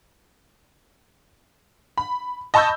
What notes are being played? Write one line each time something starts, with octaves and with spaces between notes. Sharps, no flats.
B5
D#5 A5 B5 C#6 E6 G6